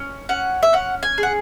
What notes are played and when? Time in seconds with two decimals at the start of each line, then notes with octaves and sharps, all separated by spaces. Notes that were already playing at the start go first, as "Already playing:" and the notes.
Already playing: C#4
0.29 C#4 F#5
0.63 E5
0.73 C#4 F#5
1.03 G#5
1.18 G#4
1.23 F#5